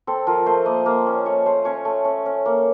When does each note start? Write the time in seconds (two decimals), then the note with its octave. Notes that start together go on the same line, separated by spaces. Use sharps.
0.07 C4 A4
0.27 F3 A#4
0.46 A3 C5
0.66 A#3 D#5
0.86 A#3
1.07 C#4
1.26 A3 C#5
1.46 A3 C5
1.65 C#4 C#5
1.85 A3
2.05 C#4
2.26 C#4
2.46 A#3